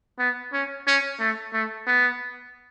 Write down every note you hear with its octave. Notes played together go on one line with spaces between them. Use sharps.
B3
C#4
C#4
A3
A3
B3